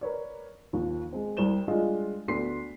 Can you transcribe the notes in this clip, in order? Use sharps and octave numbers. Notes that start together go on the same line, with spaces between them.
A#4 B4 C#5 D5
D#2 F3
G#3 C4
C2 G3 C5 E7 G7
G3 G#3 D4 F4 D#5 F5
D2 B3 D4 C6 B6 C7